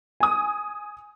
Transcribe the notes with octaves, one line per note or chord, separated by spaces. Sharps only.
G#5 D#6